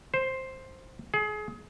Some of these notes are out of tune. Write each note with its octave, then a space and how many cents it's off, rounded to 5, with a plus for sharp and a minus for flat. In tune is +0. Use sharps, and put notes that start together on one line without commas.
C5 +5
G#4 +30